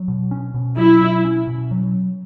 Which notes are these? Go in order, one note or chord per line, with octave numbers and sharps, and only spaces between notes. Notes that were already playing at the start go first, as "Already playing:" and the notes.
Already playing: F#3
B2
C#4
B2
F#3 E4
B2
C#4
B2
F#3